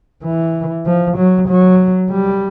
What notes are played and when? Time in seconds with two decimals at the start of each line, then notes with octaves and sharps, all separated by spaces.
0.23 E3
0.86 F3
1.17 F#3
1.48 F#3
2.11 G3